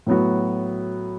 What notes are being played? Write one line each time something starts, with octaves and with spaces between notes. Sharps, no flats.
A2 F#3 B3 F#4